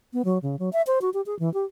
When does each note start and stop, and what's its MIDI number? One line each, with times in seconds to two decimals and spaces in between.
0.13 0.22 59
0.25 0.38 54
0.42 0.56 49
0.59 0.69 54
0.73 0.82 76
0.87 0.99 72
1.01 1.10 66
1.14 1.21 67
1.26 1.37 68
1.39 1.52 52
1.54 1.65 67